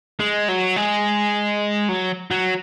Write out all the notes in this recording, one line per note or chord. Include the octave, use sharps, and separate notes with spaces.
G#3
F#3
G#3
F#3
F#3